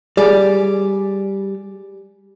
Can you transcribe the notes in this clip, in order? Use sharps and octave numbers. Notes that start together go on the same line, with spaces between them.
G3 G#4 D5